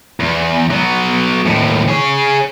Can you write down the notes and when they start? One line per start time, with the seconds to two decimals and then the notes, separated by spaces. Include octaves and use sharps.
0.20 E2
0.70 F#3 B3
1.46 D#2 A2
1.88 G#4 C#5